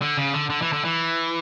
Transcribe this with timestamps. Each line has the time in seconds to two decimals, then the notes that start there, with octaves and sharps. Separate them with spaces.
0.02 D3
0.18 C#3
0.33 D3
0.50 D3
0.62 E3
0.73 D3
0.85 E3